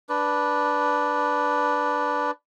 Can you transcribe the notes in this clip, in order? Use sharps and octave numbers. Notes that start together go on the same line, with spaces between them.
D4 B4